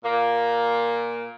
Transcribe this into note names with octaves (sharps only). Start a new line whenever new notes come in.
A#2 A#3